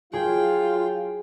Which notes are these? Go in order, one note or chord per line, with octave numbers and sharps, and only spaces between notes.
F#3 F4 G#4 G5